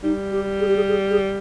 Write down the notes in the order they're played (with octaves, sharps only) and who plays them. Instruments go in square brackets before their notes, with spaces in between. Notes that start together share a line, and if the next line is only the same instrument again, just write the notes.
[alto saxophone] G3 [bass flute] D#4
[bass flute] G4
G#4
G4
G#4
G#4
G#4